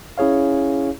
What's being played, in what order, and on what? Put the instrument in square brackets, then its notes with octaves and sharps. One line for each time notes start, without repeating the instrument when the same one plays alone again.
[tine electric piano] C#4 E4 G#4 C#5 F5